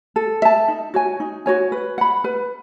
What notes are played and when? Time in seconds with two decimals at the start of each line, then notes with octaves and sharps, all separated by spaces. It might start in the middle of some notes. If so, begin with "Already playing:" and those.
0.16 A4
0.42 E5 A5
0.68 D#4
0.94 F#4 C#5 G#5
1.20 D#4
1.46 F#4 C#5 G#5
1.72 B4
1.98 F#5 B5
2.24 B4